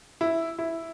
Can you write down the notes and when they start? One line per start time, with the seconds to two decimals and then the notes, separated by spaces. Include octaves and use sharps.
0.21 E4
0.59 E4